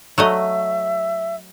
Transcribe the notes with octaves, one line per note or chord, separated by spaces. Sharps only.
F#3 A3 D#5 E5